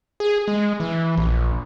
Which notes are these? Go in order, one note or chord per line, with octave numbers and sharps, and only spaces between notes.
G#4
G#3
E3
A#1